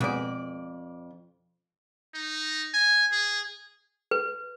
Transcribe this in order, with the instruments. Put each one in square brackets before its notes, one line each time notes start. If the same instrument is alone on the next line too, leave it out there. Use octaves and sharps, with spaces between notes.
[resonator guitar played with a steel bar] F2 D5 [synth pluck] B2 G#3
[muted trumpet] D#4
G#5
G#4
[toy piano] B4